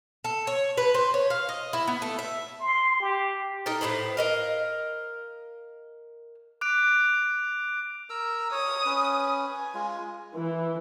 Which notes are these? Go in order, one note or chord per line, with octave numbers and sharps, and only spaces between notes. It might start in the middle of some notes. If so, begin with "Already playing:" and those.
A4
C#5
B4
C5
C#5
F5
D#5
E4
B3
A3
E5
C6
G4
D#4 A4 A#4
A2 C3 B4 C5
A#4 D#5 F5
D6 F#6 D7
A#4 A#5 E6
C#5 D#6
C#4 B4
G#5
G#3 F4
E3